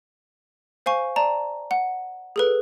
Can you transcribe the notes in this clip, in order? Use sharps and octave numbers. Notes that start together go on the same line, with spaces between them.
C5 F5 G#5 C#6
D5 A5 A#5
F#5
G#4 A4 B4